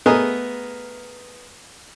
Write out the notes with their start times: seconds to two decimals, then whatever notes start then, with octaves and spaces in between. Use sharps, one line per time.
0.06 A3 B3 G#4 A#4 D#5